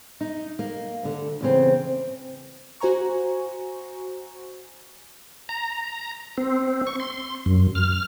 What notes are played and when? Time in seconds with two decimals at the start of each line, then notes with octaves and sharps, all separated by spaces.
0.21 D#4
0.59 A#3
1.03 D2 D3
1.41 E2 C#3 C4
2.81 F#4 C5 G#5 A#5 C#6
5.49 A#5
6.38 C4
6.87 C#6
7.00 C6
7.46 F#2
7.75 F6